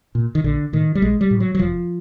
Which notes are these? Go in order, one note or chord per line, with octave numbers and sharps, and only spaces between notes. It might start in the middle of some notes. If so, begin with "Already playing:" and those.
A#2
D#3
A#1 D3
A2 D#3
G3
A#1 G#3
G3
A2
F#3
F#3
F1 F3